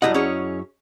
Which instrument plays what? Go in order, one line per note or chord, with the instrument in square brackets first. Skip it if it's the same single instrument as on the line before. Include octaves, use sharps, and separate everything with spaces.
[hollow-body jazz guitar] F#2 E4 F#5 [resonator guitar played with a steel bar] G3 G4 D#5
[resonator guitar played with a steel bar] C#4 G#4 C#5